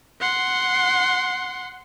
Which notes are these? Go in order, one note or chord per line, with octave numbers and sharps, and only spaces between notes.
F#5 C6